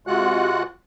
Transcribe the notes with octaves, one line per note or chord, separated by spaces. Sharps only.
C3 G#3 F4 F#4 F#5 F#6